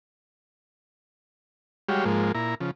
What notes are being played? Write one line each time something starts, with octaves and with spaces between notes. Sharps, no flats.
G3 G#3 F#4 G4 C#5 F5
G#2 F3 G#3 A#3
A#2 E4 A#5
C#3 F3